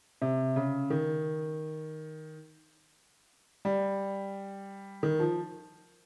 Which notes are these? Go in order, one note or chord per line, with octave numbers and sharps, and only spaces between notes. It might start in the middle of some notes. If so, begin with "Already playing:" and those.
C3
C#3
D#3
G3
D#3
F3